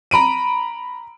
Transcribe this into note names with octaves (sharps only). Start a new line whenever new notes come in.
A#5 B5 D7 D#7